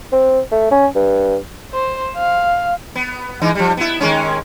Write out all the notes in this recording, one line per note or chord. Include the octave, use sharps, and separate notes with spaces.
C4
A3
C#4
G2
C5
F5
B3
E3 G#3 D#4
F3 G3
B3 E4
D#3 G#3 C#4